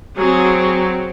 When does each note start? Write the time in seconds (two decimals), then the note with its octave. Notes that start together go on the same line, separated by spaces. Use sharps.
0.17 F#3 C4 G#4